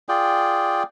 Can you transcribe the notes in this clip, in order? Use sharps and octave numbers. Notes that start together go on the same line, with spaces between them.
F4 G#4 D5 G5